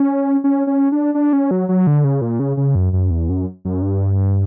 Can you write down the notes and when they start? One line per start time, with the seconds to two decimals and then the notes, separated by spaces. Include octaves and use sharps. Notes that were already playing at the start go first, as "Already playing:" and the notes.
Already playing: C#4
0.44 C#4
0.67 C#4
0.92 D4
1.15 D4
1.33 C#4
1.51 F#3
1.69 F#3
1.87 D3
2.04 C#3
2.21 A#2
2.40 C#3
2.57 C#3
2.75 F#2
2.93 F#2
3.10 E2
3.29 F#2
3.65 F#2
3.82 G2